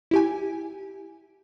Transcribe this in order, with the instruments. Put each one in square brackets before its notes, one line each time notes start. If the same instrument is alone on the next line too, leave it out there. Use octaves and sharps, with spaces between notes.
[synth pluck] E4 G4 G#5